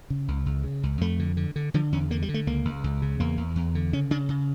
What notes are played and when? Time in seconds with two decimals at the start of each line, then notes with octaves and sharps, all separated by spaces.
0.10 C#3
0.28 C#2
0.46 C#2
0.64 C#3
0.83 C#2
1.01 F2 A3
1.19 D3
1.37 D3
1.56 D3
1.74 D3 F3
1.92 E2 C#4
2.10 D3 A#3
2.22 G3
2.29 D3
2.34 A3
2.47 C#2 A#3
2.65 C#2
2.84 C#2
3.02 C#3
3.20 E2 A#3
3.37 E2
3.56 E2
3.75 D3
3.93 C#3 C#4
4.11 C#3 D4
4.29 C#3